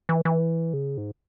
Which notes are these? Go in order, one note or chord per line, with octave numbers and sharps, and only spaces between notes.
E3
E3
C#3
G#2